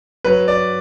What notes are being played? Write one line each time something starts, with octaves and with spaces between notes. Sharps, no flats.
F#3 B4
D5